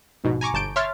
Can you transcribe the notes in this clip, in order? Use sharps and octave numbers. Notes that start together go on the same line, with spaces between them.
A#1 G#2 B2
G#5 A#5 C#6 D6
G1 A5 G6 D7
C#5 E5 C6 F6 A6